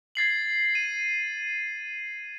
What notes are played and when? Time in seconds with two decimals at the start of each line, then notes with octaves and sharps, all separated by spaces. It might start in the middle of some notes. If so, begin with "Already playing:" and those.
0.15 G#6 A6 C7 F#7
0.75 D#7